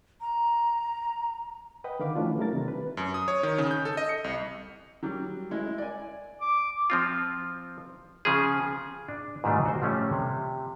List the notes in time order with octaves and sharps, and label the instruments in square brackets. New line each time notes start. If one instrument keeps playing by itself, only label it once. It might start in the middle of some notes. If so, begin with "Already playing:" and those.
[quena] A#5
[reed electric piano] B4 D#5 F#5 G5
D3 D#3 F5 B5 D6
E3 F3 A3 C#4 D4 F4
F#3 G3 A3 E4 A#4 A6
C3 D#3 D4
B4
[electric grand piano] F#2
D#6
C#5
D#3
C#3
G6
A4
D#5
C#7
C2
[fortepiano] F#3 G3
G#3 E4
D5 G#5
[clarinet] D6
[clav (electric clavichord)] F3 C4 F4
C#3 F3 G#4
D4
G#2 D#3 G3 A3 D4 F4
F#4 C5
F3 G3 A3 C#4
C3